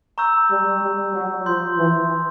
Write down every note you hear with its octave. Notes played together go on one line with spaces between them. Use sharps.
A#5 C#6 E6 G6
G3
G3
F#3
F3 C6 D#6 G6
E3